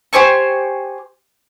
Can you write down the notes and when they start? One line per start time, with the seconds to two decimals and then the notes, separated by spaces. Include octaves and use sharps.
0.13 G4 C5 G#5 C#6